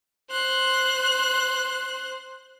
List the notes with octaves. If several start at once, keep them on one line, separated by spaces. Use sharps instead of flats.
C5 F#6